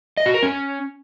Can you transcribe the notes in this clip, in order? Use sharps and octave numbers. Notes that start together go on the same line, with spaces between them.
D#5
F#4
A#4
C#4